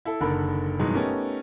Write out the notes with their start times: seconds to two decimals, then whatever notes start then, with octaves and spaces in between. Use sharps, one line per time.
0.05 E4 A4
0.20 F#1 D3 D#3 A4 A#4 B5
0.79 G2 B2 D#3 E3 F#3 G#3
0.93 A3 B3 C#4 D#4 G4 A#4